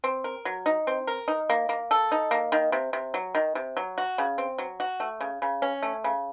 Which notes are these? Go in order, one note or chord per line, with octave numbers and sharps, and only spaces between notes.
C4
A#4
F#3
D#4
C4
A#4
D#4
A#3
A#3
A4
D#4
A#3
D#3
C3
C3
F#3
D#3
C3
F#3
F#4
C#3
C4
F#3
F#4
A3
C#3
C#3
C#4
A3
C#3